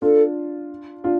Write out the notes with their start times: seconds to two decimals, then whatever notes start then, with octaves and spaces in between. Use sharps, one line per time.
0.02 D4 F4 A4
1.04 D4 F4